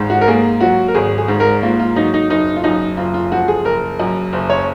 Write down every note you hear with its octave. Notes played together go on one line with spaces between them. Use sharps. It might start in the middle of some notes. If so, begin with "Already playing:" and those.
Already playing: G#1 G#2
F#4
A#4
A#3 G#4
F#3 F#4
A#4
G#1 G#4
G#4
G#2
A#4
A#3 F4
F4
F#3 D#4
D#4
F#1 D#4
F4
F#2 D#4
F#1 F4
F4
F3 F#4
G#4
F#1 A#4
F#2
F#1
C#5